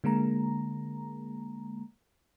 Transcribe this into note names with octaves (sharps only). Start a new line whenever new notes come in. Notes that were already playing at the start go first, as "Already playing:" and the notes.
D3 G#3 A#3 A#5